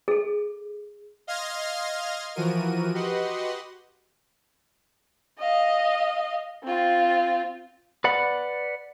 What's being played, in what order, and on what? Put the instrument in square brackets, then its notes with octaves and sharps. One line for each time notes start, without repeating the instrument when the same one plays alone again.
[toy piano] G#4 A4
[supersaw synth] D#5 F5 C6 F6 G#6 A#6
E3 F3 F#4 A#4 D#7
F#4 G4 B4 D#5 F#5 C6
[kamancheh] D#5 F5
C4 F4
[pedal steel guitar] B4 D5 F#5 B5